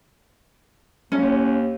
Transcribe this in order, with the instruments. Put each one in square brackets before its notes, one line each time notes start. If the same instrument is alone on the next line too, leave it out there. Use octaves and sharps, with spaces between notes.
[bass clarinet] D#2 [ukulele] C#4